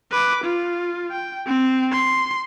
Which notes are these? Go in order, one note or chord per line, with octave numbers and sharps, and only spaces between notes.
B4 D6
F4
G5
C4
C6